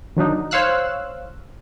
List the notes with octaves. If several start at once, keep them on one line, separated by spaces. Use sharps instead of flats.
D#3 F#3 D4 D#4
C5 C#5 F5 E6 F#6